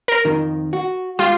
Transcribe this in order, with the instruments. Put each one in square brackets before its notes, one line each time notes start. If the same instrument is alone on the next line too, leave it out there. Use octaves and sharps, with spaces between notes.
[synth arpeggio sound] A#4
[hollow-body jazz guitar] F2 D#3
F#4
[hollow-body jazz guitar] G#3 G4 [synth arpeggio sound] F4